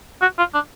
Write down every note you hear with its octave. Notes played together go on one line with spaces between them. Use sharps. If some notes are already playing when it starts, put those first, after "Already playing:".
F#4
F4
D4